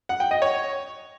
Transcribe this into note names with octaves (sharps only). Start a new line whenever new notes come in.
F#5
G5
D#5
C#5